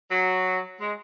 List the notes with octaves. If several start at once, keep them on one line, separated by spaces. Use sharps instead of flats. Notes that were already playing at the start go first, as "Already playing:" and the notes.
F#3
G#3